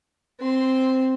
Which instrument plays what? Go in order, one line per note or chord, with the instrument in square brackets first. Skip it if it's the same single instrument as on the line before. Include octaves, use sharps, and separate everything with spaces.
[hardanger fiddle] C4 C6